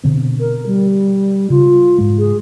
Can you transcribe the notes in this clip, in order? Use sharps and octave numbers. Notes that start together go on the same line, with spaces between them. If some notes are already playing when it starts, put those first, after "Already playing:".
B2 D3 C4
A#4
G3
C#3 F4
G#2 G#3
G#4